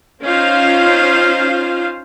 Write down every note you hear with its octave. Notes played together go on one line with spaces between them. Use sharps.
C#4 D#4 F4 C5 F5